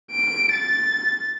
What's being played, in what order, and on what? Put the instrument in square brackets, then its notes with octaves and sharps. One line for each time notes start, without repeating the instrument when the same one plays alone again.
[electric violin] D7
A6